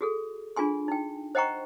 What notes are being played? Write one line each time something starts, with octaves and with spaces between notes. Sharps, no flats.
F#4 G#4 A4
D4 F4 G#4 G#5 C6
D#4 G5
C5 D#5 F#5 G5 A#5 C#6